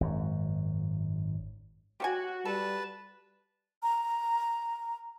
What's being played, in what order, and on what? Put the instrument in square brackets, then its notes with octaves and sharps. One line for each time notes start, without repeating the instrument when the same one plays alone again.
[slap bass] G#1 F#2
[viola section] F#4 [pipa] G4 C#5 G#5
[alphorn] G3 [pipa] A4 [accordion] B4 A5
[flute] A#5